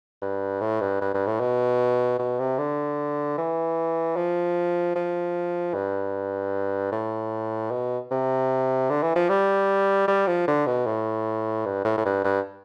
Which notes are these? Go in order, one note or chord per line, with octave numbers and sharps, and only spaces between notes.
G2
A2
G2
G2
G2
A2
B2
B2
C3
D3
E3
F3
F3
G2
A2
B2
C3
D3
E3
F3
G3
G3
F3
D3
B2
A2
G2
A2
A2
G2
G2